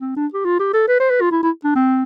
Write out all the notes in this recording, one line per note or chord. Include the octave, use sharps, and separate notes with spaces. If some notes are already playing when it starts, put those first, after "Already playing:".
C4
D4
G4
F4
G4
A4
B4
C5
B4
F4
E4
E4
D4
C4